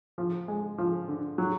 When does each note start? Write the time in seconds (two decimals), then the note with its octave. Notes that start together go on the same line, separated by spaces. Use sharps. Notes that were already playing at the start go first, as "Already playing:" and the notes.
0.18 F3
0.48 G#3
0.78 F3
1.08 D3
1.38 F#3